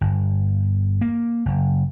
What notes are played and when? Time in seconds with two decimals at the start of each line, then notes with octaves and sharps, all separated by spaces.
0.01 G1
1.01 A#3
1.46 F#1